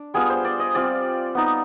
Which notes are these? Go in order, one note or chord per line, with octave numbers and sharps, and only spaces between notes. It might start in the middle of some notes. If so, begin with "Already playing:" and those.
Already playing: D4
G3 B3 F4 G#4
C5
D5
D#5
G3 C4 F4 D5
B3 D#4